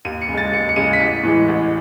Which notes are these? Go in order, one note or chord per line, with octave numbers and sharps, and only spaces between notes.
D#2 D#7
C#7
C#3
G#3 A6
D#2 C#7
C#7
C#3 G#3 D#7
B6
A1 C#7
A2 E3 G#3
A1